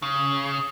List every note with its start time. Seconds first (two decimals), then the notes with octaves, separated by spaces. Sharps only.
0.02 C#3